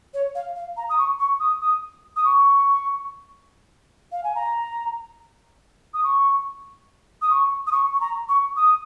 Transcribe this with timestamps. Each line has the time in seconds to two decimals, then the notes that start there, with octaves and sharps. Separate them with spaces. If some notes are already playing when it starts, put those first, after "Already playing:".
0.14 C#5
0.35 F5
0.56 F5
0.77 A#5
0.90 D#6
0.98 C#6
1.19 C#6
1.40 D#6
1.61 D#6
2.16 D#6
2.25 C#6
4.12 F5
4.24 G#5
4.35 A#5
5.94 D#6
6.04 C#6
7.22 D#6
7.31 C#6
7.67 D#6
7.72 C#6
7.94 C#6
8.01 A#5
8.29 C#6
8.57 D#6